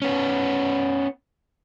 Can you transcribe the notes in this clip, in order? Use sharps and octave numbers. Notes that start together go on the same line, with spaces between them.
B3 C#4